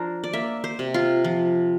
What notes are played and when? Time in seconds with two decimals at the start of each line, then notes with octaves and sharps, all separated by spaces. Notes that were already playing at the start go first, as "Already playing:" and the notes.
Already playing: F3 D4 A#4 C5
0.24 D5
0.33 A#3 E5
0.64 C5
0.79 C3
0.94 F4
1.24 F3